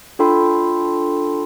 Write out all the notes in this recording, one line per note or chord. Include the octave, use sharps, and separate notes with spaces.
D4 F4 A4 G5 B5 C6